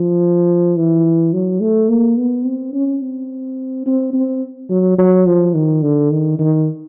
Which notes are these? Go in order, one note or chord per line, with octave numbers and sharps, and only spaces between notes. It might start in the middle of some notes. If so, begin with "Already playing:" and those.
Already playing: F3
E3
F#3
A3
A#3
B3
C4
C#4
C4
C4
C4
F#3
F#3
F3
D#3
D3
D#3
D#3